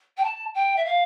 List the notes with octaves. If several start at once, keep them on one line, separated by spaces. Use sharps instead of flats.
G5
A5
G5
E5
F5